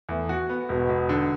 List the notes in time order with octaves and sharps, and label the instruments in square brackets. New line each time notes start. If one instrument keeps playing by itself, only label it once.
[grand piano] E2 [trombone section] E3 A3
[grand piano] F#4
B3
[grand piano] E1 [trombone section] B2
[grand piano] E1
D3